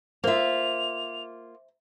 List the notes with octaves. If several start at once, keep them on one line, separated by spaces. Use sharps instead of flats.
A#3 F4 C5 E5 F7